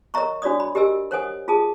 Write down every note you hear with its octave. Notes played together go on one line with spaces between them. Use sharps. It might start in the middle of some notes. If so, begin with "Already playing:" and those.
A#4 C#5 D#5 E5 A#5 C#6
D4 F#4 C#5 D5 D#6
B5
G4 A#4 D#5 G#5 E6
A#4 C5 C#5 F#5 G#5 D#6
F4 G#4 A5 D#6